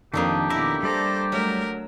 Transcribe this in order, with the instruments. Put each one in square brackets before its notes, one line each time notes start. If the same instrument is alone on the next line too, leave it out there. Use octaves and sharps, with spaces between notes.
[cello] F2 [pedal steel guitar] D#3 D#6 [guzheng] A#3 D4 A4 [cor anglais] G4
[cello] B2 E4 [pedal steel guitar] D#3 A#5 D6 [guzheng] E5
[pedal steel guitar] G3 D5 A#5 [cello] A4 C5
[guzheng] F#3 [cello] A3 A#4